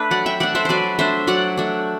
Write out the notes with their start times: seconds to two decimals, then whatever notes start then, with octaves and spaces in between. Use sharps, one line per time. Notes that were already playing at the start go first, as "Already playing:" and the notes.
Already playing: A3 D4 B4
0.11 F#3 D5 F#5
0.26 E5 G5
0.40 A3 D4 D5 F#5
0.55 C5 E5
0.65 F#3 B4 C5 D5
0.99 A3 D4 C5 E5
1.27 F#3 D5 F#5
1.57 A3 D4